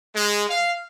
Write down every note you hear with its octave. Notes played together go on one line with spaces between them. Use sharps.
G#3
F5